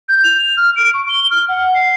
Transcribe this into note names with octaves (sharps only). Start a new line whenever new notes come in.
G6
F7
F6
D7
C#6
G7
F6
F#5
C7